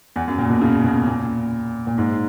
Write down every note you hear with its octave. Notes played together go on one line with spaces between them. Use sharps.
E2
F#2
A#2
B2
C#3
B2
A#2
A#2
G#2